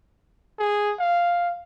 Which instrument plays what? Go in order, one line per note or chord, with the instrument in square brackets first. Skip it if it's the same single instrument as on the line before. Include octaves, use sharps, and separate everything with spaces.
[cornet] G#4
F5